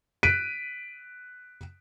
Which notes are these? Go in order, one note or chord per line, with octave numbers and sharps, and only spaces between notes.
F#6 B6 D7 D#7